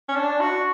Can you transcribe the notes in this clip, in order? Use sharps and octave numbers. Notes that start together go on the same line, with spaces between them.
C#4
D4
F#4